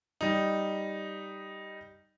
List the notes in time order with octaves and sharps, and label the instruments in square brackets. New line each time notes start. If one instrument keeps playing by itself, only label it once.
[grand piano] G3 D#4